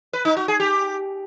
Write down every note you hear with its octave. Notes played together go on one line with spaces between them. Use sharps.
B4
D#4
F#4
G#4
G4